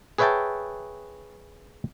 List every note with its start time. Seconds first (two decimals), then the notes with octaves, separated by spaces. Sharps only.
0.18 G#4 B4 C#5 E5 G5 A5